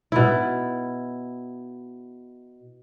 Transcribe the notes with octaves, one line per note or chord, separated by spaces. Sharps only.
B2 E4